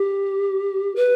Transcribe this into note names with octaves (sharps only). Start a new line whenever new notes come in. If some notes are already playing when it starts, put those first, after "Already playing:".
Already playing: G4
B4